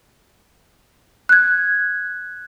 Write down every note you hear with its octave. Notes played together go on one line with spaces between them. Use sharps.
F#6 G#6